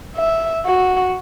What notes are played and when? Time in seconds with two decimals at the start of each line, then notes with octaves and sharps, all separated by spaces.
0.17 E5
0.66 F#4